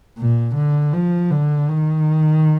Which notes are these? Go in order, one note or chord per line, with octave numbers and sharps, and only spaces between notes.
A#2
D3
F3
D3
D#3